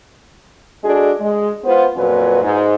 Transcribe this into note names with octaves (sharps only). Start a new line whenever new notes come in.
G#3 D4 F#4 G#4 A4
G#3
B3 F4 B4 C5
F2 A#2 F#3 C#4 B4
G#2